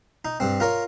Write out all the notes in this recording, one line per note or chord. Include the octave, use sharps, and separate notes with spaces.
D#4
G2 C4
F4 A#4 C#5